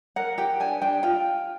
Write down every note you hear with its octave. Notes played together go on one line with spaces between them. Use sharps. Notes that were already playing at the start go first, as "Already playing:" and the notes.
A#4 F#5
G4 G5
D4 G#5
D4 G5
F4 G5